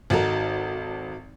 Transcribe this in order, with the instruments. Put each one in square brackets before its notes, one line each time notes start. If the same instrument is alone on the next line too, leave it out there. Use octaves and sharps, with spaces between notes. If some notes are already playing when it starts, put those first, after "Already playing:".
[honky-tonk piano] G#1 A4 [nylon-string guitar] D#4 F#4 A#4